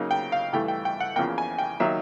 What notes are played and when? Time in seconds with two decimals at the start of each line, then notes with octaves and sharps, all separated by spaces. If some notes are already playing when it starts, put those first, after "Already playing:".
Already playing: C#3 F#3 A#3 D#4
0.11 G5
0.32 F5
0.53 G2 E3 A3 G5
0.68 G5
0.85 G5
1.00 F#5
1.16 E2 C#3 F3 A#3 G5
1.38 G#5
1.58 G5
1.80 D#3 F#3 A#3 D#4 E5